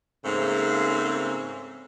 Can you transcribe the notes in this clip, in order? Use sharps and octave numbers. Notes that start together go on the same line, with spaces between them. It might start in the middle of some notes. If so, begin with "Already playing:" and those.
G#2 C#3 A3 A#3 C4